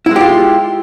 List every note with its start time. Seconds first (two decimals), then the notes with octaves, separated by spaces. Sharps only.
0.06 E4
0.11 G#3
0.16 G4
0.21 F4